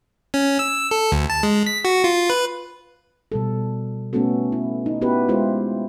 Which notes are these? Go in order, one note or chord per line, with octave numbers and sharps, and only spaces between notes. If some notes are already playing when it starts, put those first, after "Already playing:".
C#4
E6
A4
D2
A5
G#3
B6
F#4
F4
B4
B2 G3 A4
A3 B3 C#4 F#4 A4
E4
D#4
B3 C#4 E4 F#4 G4 B4
G#3 E4 F4 G4 C5